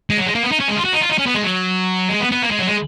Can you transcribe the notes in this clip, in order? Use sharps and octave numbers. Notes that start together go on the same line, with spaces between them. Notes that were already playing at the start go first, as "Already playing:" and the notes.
G#3
F#3
G#3
A#3
B3
D#4
C#4
G#3
F4
F#4
D#4
F4
D#4
C#4
B3
G#3
F#3
G#3
B3
B3
A#3
G#3
F#3
G#3